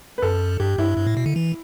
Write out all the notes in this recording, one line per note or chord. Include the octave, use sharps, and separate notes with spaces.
B4
F#2 A4
G2 G4
G2 E4
G2
A2
B2
D3
E3